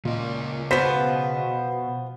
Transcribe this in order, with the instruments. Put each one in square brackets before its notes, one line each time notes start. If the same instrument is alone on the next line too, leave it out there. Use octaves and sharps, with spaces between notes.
[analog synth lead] A#2 [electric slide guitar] C#3 D#5
[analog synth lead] B2 [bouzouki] F3 B3 [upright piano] C5 B6